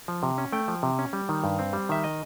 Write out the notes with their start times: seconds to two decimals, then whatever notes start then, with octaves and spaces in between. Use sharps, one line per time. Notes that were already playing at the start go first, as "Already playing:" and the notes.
0.08 F3
0.23 C3
0.38 C#4
0.53 A3 G5
0.68 F3
0.83 C3
0.99 C#4
1.13 G3
1.29 D#3
1.44 G2
1.59 C4
1.73 G3
1.89 D#3 E5
2.04 D#5